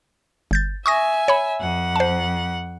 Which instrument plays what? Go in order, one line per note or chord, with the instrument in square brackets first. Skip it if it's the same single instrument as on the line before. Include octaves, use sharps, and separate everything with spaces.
[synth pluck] G1 G6 A6
[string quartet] E5 G#5 [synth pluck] C#6 D#6 A#6
[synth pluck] C#5 B5
[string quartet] F2 F#5
[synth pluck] C5 A5